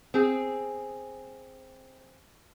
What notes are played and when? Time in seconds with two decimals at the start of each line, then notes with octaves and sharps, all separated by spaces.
0.14 C4 G#4